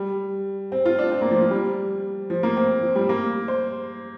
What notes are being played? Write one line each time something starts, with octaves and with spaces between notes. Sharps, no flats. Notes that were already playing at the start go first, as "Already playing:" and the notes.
Already playing: G3
C4
F4
D4
C4
A#3
F3
F3
G3
F3
A#3
C4
F3
G3
A#3
C5